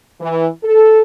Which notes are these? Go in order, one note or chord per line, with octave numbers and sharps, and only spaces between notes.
E3
A4